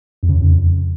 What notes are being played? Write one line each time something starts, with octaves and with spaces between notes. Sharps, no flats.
F2
C#3
E2
F2